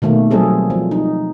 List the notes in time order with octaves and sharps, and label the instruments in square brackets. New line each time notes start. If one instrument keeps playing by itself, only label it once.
[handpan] B2 D#3 A3 A#3
F#3 G3 C4 G#4 A4
F3
D#4